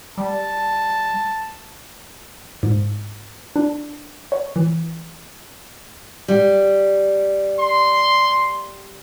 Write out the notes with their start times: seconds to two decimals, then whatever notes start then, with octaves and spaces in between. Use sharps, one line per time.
0.18 G3 A5
2.63 G#2
3.56 D4
4.32 C#5
4.56 E3
6.28 G3
7.59 C6